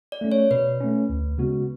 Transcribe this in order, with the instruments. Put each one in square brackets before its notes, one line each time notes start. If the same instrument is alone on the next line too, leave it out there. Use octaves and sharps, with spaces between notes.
[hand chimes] D5
[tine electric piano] A3 C#4
[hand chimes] C#5
[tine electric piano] B2 [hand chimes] B4
[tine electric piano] A3 C#4
D2
C#3 G#3 B3 F#4